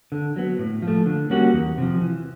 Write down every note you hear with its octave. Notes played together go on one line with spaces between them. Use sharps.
D3
F#3 B3
A2
F3
A3
D3
G3 A#3 C#4 F#4
E2
C3 F3
E3